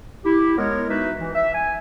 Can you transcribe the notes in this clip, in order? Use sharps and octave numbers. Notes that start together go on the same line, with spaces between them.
E4 G4
G#3 B3 A#4 C#5
D#4 F#4 B4 E5
E3
E5
G#5